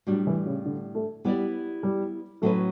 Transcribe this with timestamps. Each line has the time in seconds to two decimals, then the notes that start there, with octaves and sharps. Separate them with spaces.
0.07 A2 F#3 G3 D4
0.27 E3
0.46 C#3
0.66 D3
0.95 A3
1.25 G3 B3 E4 G4 B4 D5
1.83 G3
2.42 A2 F#3 A3 C#4 F#4 B4